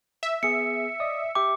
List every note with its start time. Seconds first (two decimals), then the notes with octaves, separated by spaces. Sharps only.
0.23 E5
0.43 B3 G#4 C#7
1.00 D5 D#5 D#6
1.35 G4 E5 G5 D6